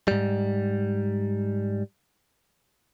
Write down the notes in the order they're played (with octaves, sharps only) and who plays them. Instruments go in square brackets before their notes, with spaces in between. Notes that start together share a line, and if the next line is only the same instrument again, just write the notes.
[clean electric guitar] G#2 G3